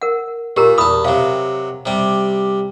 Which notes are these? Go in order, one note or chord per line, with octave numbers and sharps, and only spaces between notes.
A#4 F#5
A#2 G4 A#4 A#5
E2 A5 B5 D#6
C3 F#3 F5
C3 G3